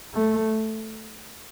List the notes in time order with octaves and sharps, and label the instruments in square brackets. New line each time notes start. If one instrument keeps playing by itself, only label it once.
[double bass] A3